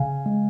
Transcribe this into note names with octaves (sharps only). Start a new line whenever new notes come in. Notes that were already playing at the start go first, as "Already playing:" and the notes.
Already playing: C#3 F5 G#5
G#3